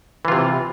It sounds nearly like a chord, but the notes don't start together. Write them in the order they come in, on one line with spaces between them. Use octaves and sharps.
E3 F4 C3